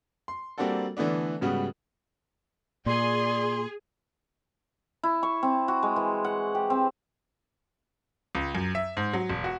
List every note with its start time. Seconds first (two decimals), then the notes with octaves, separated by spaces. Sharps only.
0.28 C6
0.58 G3 A#3 C4 D4 F#4 A4
0.97 D3 E3 A3 B3 D4
1.41 G#2 C#3 G3 B3 F#4
2.86 A#2 G#4 D5 C6
5.03 E4
5.23 C#6
5.43 C4
5.68 F#4
5.83 G#3
5.96 E3
6.25 F#5
6.55 G4
6.70 C4
8.35 C#2
8.55 F#2
8.75 E5
8.97 G#2
9.13 F#3
9.29 E1
9.44 F#4